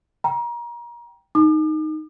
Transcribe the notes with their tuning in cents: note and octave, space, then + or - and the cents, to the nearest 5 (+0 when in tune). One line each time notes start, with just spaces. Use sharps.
G5 +0 A#5 +30
D#4 +0 D6 +45